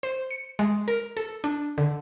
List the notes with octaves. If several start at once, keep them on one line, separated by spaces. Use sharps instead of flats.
C5
C#7
G#3
A#4
A4
D4
D3